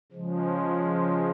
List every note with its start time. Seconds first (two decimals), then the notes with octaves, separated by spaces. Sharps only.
0.12 C#3 F3 G#3